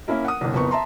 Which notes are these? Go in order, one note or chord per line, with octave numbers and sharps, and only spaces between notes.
A#3 C#4 E4 A#4
F#5 D#6
G1 C2
F#1 F2 B3 C#6
E5 A5 A#5 C6